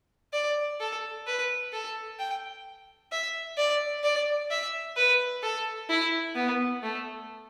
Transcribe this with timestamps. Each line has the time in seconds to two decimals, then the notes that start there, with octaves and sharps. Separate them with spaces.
0.33 D5
0.80 A4
1.27 B4
1.72 A4
2.19 G5
3.12 E5
3.58 D5
4.03 D5
4.51 E5
4.97 B4
5.43 A4
5.89 E4
6.35 B3
6.83 A3